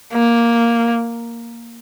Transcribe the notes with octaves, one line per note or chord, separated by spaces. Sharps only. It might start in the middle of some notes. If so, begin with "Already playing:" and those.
A#3